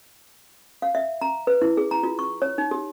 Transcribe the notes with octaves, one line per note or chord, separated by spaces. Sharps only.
F5
E5
A#5
B4
E4
G#4
A#5
F4
C#6
C#5
D#4
G4